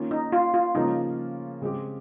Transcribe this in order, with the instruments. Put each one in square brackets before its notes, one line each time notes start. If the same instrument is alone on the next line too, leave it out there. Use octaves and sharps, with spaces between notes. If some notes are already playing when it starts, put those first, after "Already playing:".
Already playing: [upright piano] D#3 A#3 C#4 F4
[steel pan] D#4
F4
F4
[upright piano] C#3 F3 A#3 C#4 F4 [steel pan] D#4
[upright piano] C#3 G#3 C4 G4